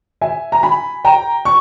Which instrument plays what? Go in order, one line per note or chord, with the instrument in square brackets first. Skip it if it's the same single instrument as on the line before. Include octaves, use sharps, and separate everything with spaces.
[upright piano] E5 G#5
A#5
G#5 B5
G5 A#5
C#6